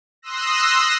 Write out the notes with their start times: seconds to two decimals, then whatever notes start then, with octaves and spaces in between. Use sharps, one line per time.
0.22 C6 D#6 E6 F#6 A#6